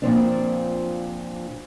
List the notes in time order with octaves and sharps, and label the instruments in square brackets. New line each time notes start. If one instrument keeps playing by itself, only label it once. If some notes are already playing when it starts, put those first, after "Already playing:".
[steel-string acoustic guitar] A#2 F3 C4 D4